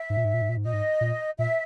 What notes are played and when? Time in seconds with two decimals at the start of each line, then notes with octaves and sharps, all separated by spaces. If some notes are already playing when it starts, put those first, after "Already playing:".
Already playing: E5
0.10 G#2
0.17 A#2
0.25 G#2
0.34 A#2
0.42 G#2
0.49 A#2
0.57 G#2
0.64 A#2 D#5
0.73 G#2
1.01 A#2
1.38 A#2 E5